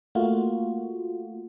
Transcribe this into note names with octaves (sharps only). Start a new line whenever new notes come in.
A3 A#3 F4 F#4